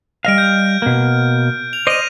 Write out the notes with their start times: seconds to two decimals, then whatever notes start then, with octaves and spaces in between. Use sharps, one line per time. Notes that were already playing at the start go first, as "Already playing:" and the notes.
0.25 G3 D#5 F5 F6 D7
0.38 G6
0.82 B2 A#3
1.73 F7
1.87 C5 D5 D#5 A#6 D#7